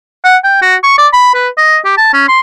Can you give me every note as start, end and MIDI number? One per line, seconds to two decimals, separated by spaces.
0.24 0.36 78
0.44 0.60 79
0.62 0.75 66
0.83 0.95 85
0.98 1.07 74
1.13 1.34 83
1.34 1.48 71
1.57 1.78 75
1.85 1.94 67
1.98 2.09 81
2.13 2.24 61
2.28 2.40 84